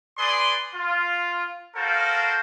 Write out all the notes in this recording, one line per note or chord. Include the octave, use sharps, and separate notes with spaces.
G#4 B4 D5 C6
F4
F#4 A4 A#4 C5 F5